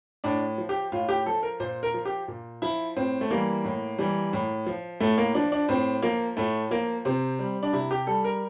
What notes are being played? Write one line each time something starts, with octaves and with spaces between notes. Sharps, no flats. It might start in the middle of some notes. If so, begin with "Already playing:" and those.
A2 D4
F3
G4
A2 F4
G4
F3 A4
A#4
A#2 C5
A#4
F3
G4
A#2
F3 E4
A2 C4
A3
E3 G3 A#3
A2
E3 G3
A2
F3
A2 A3
A#3
F3 D4
D4
A2 C4
F3 A#3
A2 A3
F3 A#3
C3 C4
G3
D4
C3 E4
G4
G3 A4
A#4